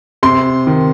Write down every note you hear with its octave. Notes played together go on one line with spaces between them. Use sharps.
C3 C6
D#3